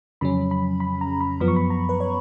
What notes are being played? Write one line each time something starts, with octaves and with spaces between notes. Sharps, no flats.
F2 C#3 F#3 C#4 B5
B5
B5
A#5
B5
F#2 F3 B3 B5
C#6
B5
A#5
B4
C#5